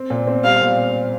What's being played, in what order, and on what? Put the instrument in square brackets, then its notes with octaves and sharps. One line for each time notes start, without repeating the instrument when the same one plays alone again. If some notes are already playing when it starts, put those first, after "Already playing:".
Already playing: [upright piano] C4
A#2
C4
[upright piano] G3 [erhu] F5
[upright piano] A#2